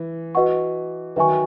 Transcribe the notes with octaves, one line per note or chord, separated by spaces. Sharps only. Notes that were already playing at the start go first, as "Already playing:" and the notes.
Already playing: E3
F#4 B4 D#5 F#5 C#6
D#3 F#3 B4 E5 G#5 C#6